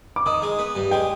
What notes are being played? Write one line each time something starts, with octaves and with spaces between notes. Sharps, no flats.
D6
D#3 D#6
G#3
B3
G2
G#3 G5